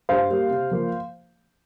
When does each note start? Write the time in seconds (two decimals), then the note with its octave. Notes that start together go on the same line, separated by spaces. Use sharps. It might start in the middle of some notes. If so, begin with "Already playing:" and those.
0.09 G2 C5 F5
0.30 G3 A#3
0.50 C3
0.71 F3 A#3